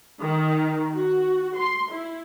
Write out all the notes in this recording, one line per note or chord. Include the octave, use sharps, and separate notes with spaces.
D#3
F#4
C6
E4